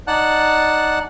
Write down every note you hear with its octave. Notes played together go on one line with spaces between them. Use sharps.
D#4 D5 F#5 A5 F#6